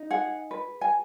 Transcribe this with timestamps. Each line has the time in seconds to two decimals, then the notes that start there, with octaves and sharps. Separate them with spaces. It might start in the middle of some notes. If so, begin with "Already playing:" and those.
Already playing: D#4
0.10 G#4 F#5
0.51 B4
0.81 G#5